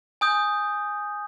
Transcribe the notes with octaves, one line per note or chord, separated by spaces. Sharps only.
G#5 D#6 G6